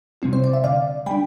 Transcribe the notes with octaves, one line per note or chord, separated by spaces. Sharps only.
C3 G3 C4 E4
C5
D5
E5
D3 D5 F5
G3 D4 G5 B5